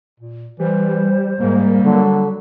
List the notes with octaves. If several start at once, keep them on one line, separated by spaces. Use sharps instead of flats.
A#2
E3 G3 C5
G#2 G3 A#3
D3 F#3